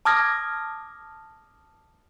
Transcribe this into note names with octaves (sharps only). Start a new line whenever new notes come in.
A5 D6 D#6 F6 G#6 A#6